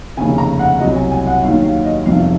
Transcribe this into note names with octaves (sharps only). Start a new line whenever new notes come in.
F1 D#2 C#3 G#5
A#5
F#5
C2 C3 F#3 D#5
G#5
G#5
F#5
D#2 D#3 F#3 F5
F5
D#5
F1 F2 D#3 F#3 F5